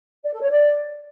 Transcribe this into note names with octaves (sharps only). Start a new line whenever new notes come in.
D5
A4
C#5
D5